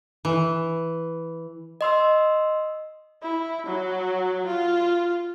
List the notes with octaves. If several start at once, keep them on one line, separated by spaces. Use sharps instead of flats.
E3
D#5 C6 E6
E4
F#3
F4